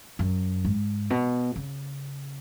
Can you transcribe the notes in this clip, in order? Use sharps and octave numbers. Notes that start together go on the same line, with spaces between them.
F#2
G#2
B2
C#3